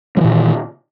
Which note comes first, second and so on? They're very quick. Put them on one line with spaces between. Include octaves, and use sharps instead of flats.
G3 E3 A#2 D#3